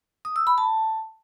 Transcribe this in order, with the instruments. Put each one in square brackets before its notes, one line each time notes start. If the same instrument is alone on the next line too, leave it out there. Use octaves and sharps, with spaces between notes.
[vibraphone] D#6
E6
B5
A5